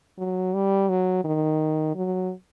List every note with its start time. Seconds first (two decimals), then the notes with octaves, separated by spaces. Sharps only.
0.19 F#3
0.54 G3
0.89 F#3
1.24 D#3
1.95 F#3